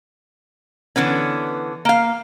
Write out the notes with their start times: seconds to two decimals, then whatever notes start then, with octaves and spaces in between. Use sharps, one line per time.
0.96 D3 E3 B3 C#4
1.85 A#3 F5